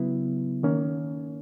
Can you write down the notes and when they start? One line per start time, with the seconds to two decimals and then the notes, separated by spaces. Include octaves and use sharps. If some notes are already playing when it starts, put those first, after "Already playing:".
Already playing: C#3 F#3 B3 E4
0.63 D#3 A#3 C#4